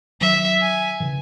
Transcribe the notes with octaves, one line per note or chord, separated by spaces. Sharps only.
D#3 F#3 E5
G#5
C#3 E3